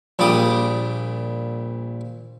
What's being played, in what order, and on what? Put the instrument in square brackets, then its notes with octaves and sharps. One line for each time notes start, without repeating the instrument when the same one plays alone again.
[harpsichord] A#1 A#2 G3 D6 D#6